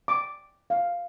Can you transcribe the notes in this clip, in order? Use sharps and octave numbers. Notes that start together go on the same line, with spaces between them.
D6
F5